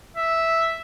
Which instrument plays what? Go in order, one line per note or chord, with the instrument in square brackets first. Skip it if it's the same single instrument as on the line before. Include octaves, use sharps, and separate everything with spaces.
[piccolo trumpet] E5